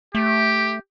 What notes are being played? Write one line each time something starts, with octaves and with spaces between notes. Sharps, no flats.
A3 G4